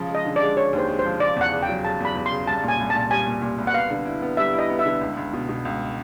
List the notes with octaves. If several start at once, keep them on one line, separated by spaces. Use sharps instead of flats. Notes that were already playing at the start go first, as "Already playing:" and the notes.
Already playing: C#3 F3
G#3
D#5
D3
D5
G#3
G#3 C#5
D#2
C5
G#3
C5
F3
C#3 D5
E2 F#5
C#3
G5
F#3
C#3 A5
E2 B5
E2
C6
C#3
C2 A5
A#2
G#5
C2
A5
A#2
G3 G#5
A#2
A#2
C2
F#5
B3 F5
D3
E4
B3
G3 E5
E4
D#5
B3
E5
D3
C#2
C#2
B2
B2
C#2